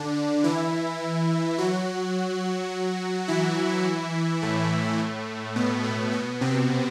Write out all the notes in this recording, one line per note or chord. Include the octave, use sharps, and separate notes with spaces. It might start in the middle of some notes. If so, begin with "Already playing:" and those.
Already playing: D3 D4
E3 E4
F#3 F#4
E3 E4
A2 A3
B2 B3
A2 A3
B2 B3
C3 C4